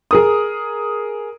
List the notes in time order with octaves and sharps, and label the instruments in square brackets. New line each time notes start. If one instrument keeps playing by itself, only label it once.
[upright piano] G#4 A#4 D#6